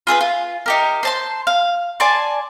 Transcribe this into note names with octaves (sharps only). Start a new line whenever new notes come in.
F4 G#4 A4 B4
F4
D#4 G4 A#4
C5 A5 C6
F5
D5 G#5 A5 C6